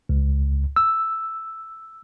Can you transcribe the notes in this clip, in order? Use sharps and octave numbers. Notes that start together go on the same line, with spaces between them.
C#2
E6